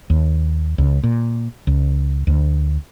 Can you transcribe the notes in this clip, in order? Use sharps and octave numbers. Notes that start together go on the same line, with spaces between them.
D#2
C#2
A#2
C#2
D2